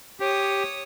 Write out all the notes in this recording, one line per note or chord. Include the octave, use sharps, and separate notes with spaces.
G4 C#5 D#6